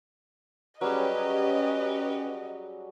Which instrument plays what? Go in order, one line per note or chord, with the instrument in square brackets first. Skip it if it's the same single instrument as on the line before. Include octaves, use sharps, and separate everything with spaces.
[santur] F#3 G3 G#4 [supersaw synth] C#4 G4 [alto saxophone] B4 [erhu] D#5